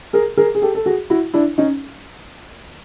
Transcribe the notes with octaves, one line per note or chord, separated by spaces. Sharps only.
G#4 A#4
G#4 A#4
G#4
G4 A4
A4
F#4 G#4
E4 F#4
D4 E4
C#4 D#4